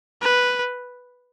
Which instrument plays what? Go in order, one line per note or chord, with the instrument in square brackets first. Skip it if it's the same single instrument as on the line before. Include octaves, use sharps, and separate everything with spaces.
[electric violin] B4